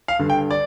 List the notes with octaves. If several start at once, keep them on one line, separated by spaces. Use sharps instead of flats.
F5
G2 D3
G5
D5